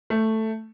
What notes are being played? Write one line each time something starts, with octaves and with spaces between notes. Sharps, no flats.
A3